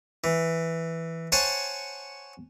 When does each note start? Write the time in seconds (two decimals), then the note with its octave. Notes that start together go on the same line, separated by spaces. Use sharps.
0.24 E3
1.32 C5 C#5 F#5 G#5 A5 C#6